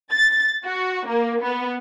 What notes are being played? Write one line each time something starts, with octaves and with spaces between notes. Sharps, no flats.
A6
F#4
A#3
B3